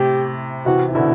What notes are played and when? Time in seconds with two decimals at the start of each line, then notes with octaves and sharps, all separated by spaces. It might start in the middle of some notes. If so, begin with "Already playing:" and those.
Already playing: A2 C3 G4
0.66 C3 E3 F#4
0.89 E3
0.94 B2 D3 E4